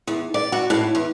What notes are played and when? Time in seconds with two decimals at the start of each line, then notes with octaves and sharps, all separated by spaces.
0.07 E2
0.34 D5
0.52 F#4
0.70 A2
0.95 E2